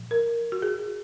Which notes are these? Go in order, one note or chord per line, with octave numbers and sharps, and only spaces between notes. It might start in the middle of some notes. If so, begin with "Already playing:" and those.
Already playing: A#2 F3
A#4
F#4
G#4